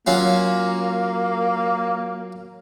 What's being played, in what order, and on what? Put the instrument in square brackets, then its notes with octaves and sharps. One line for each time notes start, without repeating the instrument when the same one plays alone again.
[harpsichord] F#3 C#4 F4 [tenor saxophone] A#3